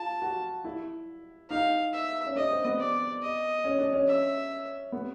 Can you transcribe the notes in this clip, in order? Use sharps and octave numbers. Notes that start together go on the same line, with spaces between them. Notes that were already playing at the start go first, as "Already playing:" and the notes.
Already playing: F4 A5
F#4
E4
D#4 F5
E5
C#4
D4 D#5
C4
B3
D5
D#5
C#4
D4
C#4
E5
B3